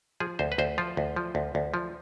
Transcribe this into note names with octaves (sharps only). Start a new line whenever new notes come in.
F3 G#4
D2 C5
B4
D2 C5
F3 F4
D2
F3
D2
D2
F3